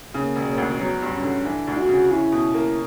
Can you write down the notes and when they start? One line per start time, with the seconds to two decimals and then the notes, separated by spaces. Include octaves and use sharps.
0.14 C#3 A#3
0.36 E1
0.47 A#3
0.58 D2
0.80 F#3 B3
1.02 G2
1.13 C#4
1.23 D3
1.45 E3 D4
1.67 D2
1.77 F#4
1.89 C#3
2.11 C#4 E4
2.32 B2
2.54 A#3